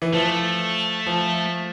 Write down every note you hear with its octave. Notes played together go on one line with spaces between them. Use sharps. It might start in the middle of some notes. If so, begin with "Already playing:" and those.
E3
F3 A3
F3